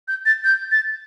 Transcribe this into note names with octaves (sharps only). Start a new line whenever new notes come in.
G6
A6
G6
A6